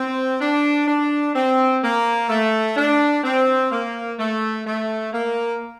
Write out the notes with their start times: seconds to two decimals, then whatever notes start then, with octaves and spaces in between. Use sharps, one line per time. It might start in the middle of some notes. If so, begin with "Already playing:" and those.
Already playing: C4
0.40 D4
0.87 D4
1.34 C4
1.83 A#3
2.29 A3
2.76 D4
3.24 C4
3.71 A#3
4.19 A3
4.66 A3
5.13 A#3